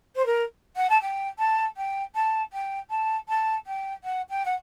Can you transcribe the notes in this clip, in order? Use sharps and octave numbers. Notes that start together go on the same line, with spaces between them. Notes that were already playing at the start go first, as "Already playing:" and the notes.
C5
A#4
F#5
A5
G5
A5
G5
A5
G5
A5
A5
G5
F#5
G5
F#5